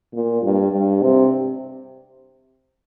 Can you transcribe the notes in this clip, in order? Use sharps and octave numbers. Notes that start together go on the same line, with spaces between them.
A#2
G2
G2
C3